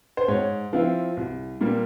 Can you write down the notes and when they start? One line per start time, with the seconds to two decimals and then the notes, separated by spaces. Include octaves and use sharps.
0.17 C5
0.28 G#2 C#5
0.73 F3 C4 E4 F5
1.17 C2
1.61 A#2 G3 A#3